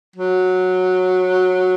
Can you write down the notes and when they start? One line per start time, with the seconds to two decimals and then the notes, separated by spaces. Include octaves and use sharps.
0.16 F#3